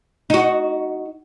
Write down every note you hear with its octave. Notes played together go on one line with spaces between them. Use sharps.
D#4 F#4